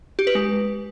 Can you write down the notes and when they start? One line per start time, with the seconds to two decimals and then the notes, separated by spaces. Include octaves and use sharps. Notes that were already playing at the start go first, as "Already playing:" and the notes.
0.19 G4
0.27 B4
0.35 G#3